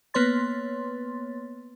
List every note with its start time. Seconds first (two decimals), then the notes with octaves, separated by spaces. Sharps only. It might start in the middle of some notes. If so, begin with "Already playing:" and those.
0.14 A#3 B3 B4 C#5 C6 A6